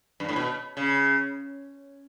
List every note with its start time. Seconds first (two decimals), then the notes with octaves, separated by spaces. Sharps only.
0.20 G2
0.29 A2
0.36 B2
0.77 C#3